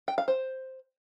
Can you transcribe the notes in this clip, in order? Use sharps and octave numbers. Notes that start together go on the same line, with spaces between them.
G5
F5
C5